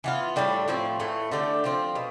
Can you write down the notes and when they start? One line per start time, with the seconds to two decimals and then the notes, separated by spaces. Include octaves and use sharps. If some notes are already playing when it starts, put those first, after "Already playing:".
0.04 E3 B3 D4 F4
0.36 A2 G3 D4 A4
0.68 A2 F3 C4
1.00 A2 E3 A3
1.32 D3 A3 D4 G4
1.64 F3 C4 F4
1.95 B2